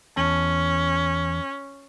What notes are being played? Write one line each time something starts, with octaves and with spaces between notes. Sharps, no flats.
E2 C#4 A5